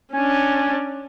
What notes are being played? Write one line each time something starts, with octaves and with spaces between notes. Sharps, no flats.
C#4 D4 G#5